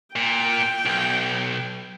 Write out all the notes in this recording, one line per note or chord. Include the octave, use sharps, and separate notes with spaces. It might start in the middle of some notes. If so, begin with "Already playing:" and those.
A#2 G5
B1